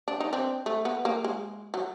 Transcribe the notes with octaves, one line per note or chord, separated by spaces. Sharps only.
D4
D#4
C4 D4
A3
B3
A#3
G#3
F#3